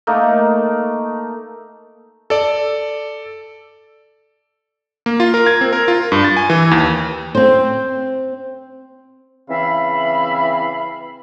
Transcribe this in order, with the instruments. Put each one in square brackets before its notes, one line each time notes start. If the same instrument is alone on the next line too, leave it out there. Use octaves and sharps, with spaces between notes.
[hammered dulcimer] A3 A#3 D#4
[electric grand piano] A4 D5
A#3
F4
A#4
G#6
C4
A#4
F4
G2
A6
G#5
E3
D#2
[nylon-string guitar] C4 C5
[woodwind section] C#3 E3 C4 E5 F5 B5